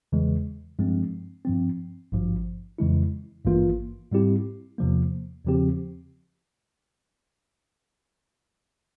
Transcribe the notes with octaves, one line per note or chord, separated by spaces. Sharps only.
E2 C#3 E3 G#3
G2 F3 G#3 C4
G2 F3 C4
G#1 G2 F3
F2 C#3 E3 G#3 E4
G#1 G2 E3 A#3 F4
G#2 G3 C4 E4 G4
E2 C3 F3 A#3
E2 C#3 F3 C4 G4